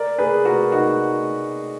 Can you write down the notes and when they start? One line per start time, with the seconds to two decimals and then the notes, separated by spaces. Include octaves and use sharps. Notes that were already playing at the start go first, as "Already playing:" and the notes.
Already playing: A#4 D5
0.18 G#4 B4
0.45 F#4 A#4
0.72 D#4 F#4